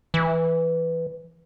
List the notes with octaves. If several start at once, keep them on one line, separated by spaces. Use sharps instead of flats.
E3